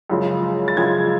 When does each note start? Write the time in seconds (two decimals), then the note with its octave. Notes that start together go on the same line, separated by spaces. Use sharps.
0.10 F#2 C#3 F3 G#3
0.68 A6
0.77 F#2 C#3 F3 G#3 G#6